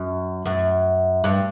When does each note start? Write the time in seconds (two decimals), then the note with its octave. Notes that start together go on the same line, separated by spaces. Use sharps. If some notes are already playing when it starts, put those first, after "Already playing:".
Already playing: F#2
0.46 F#2
1.24 G2